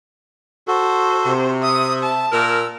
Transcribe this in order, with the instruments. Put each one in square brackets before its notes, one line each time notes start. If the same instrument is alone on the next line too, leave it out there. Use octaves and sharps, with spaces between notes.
[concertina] F#4 A4 [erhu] C5
[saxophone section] C3
[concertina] E5 [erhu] D#6
[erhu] A5
[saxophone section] A#2 A#4 [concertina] E6